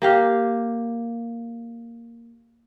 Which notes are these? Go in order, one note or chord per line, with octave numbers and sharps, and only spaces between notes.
A#3 G4 F5